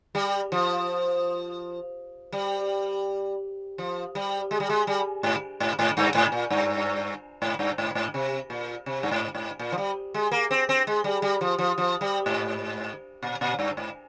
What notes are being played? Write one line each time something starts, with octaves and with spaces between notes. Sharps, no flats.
G3
F3
G3
F3
G3
G#3
G3
G#3
G3
G#2
G#2
G#2
G2
G#2
A#2
G2
G#2
G2
G#2
G#2
C3
A#2
C3
G2
G#2
G#2
A#2
F3
G3
G#3
A#3
C4
C4
G#3
G3
G3
F3
F3
F3
G3
G#2
A#2
A#2
G2
G#2